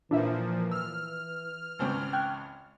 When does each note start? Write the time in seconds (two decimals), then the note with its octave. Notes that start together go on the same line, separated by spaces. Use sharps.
0.11 A#2 E3 F3 D4 E4 E5
0.71 E6 F6
1.79 G#1 C#2 C4
2.13 G5 F#6 G#6